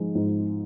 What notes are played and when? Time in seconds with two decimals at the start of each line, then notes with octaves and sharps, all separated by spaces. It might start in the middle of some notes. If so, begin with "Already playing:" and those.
Already playing: G#2 F3 G#3
0.15 G#2